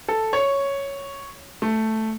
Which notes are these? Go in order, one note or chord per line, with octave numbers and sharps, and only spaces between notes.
A4
C#5
A3